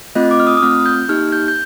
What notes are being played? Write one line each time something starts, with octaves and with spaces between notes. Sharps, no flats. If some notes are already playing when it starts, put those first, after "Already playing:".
A3 C4 F4 D#5
D6
F6
D#6
D#6
A3 C4 F4 F6
G6
A#3 D#4 G4 F6
G6
G6